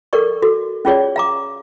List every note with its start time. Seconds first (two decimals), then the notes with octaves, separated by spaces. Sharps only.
0.13 A4 A#4 D5 C#6
0.42 F#4 A4
0.85 C#4 F4 G#4 C#5 D5
1.16 F5 A#5 D6